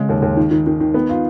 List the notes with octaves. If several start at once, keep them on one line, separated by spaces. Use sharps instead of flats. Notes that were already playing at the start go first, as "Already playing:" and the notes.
Already playing: C#3 G#3
D#2
D#2
D#3
D#3
D#3
D#3
B3
F4